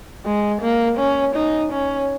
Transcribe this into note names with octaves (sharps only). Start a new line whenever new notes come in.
G#3
A#3
C#4
D#4
C#4